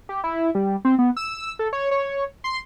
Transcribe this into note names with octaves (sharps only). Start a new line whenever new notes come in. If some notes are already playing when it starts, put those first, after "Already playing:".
G4
E4
G3
C4
B3
E6
A4
C#5
C#5
C6